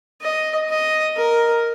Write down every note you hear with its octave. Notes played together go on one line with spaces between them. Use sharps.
D#5
D#5
A#4